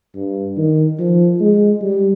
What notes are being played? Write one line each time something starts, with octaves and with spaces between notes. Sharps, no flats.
G2
D#3
F3
G#3
G3